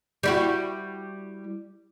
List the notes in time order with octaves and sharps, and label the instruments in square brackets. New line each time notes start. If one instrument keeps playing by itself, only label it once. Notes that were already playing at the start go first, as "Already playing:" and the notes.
[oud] G3 E4 F#4